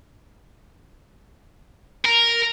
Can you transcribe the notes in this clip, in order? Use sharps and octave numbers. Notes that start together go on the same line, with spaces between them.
A#4